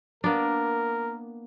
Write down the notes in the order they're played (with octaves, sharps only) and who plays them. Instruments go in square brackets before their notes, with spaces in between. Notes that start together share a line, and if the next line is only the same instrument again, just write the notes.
[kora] A#3 B3 D4 [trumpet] A#4